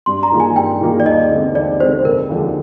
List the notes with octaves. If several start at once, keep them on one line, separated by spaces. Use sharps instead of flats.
G2 C6
A#5
D#3 A#3 F4 G#4
G#5
G2 G5
D#3 A#3 F4 G#4
D5
D#2 D#5
D3 G#3 C4
D#2 D5
D3 G#3 C4 C5
F1 A#4
D#2 D3 F3 G#3